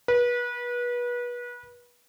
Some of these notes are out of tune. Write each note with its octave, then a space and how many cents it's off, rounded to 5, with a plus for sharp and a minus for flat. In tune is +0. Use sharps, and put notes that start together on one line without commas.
B4 -30